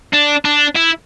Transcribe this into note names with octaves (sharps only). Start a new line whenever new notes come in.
D4
D4
E4